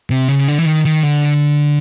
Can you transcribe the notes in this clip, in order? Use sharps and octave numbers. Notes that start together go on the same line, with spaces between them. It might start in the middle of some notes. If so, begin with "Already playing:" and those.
C3
C#3
D3
E3
D#3
D#3
D3